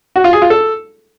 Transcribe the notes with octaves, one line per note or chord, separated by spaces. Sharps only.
F#4
F4
G#4
F4
A4